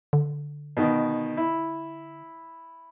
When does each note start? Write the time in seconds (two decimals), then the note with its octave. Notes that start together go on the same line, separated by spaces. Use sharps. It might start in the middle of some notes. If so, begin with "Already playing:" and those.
0.13 D3
0.77 B2 D#3
1.37 E4